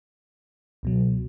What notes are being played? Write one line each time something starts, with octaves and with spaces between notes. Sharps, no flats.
C#2 B2 F#3